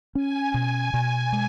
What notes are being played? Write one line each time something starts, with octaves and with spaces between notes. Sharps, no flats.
C#4 G#5
B2 G#5
B2
G#3